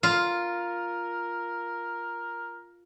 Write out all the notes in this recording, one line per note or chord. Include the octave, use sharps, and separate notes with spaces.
F4 A#4